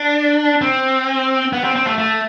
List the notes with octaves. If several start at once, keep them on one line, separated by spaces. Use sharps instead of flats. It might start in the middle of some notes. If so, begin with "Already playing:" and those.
Already playing: D4
C4
B3
C4
C4
A3
A3